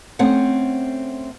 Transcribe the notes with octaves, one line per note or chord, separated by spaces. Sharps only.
A3 C4 C#4 F#5